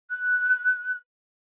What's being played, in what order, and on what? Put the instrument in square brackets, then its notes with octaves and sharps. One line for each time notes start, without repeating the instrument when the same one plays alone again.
[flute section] F#6